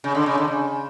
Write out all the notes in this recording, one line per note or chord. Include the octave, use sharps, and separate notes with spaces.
C#3
D3
C#3
D3
C#3